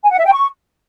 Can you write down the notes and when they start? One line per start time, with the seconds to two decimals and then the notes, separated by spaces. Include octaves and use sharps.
0.03 G#5
0.11 F#5
0.18 E5
0.25 G5
0.33 C#6